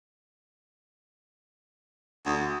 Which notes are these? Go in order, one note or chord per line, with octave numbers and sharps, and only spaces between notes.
D2 F#5 D#6